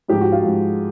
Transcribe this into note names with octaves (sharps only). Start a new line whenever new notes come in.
G#2 F3 G#3 G4
F#4
F4
G#2 F3 G#3